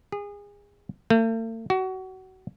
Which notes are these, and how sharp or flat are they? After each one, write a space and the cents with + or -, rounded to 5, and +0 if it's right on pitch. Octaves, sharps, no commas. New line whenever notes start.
G#4 -30
A3 +45
F#4 +25